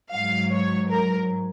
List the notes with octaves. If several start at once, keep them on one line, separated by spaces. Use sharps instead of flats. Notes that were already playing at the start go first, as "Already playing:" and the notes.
G#2 F#3 F5
C#5
A#4